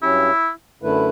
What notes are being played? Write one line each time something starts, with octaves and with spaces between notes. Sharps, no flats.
G2 F#3 C#4 E4 G4
F#2 D3 A3 E4 B4